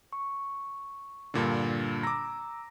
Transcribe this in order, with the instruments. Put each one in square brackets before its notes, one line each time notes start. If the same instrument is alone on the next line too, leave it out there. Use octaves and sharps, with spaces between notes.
[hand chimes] C#6
[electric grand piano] G2 A#2 D3
[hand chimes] A#5 E6 [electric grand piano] D6 A#6